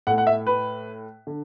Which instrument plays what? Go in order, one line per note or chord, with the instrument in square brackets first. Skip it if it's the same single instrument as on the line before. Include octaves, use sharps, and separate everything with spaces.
[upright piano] A2 A3 F#5
F#5
E5
B4
D3